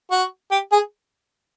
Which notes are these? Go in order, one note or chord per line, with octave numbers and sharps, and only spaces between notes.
F#4
G4
G#4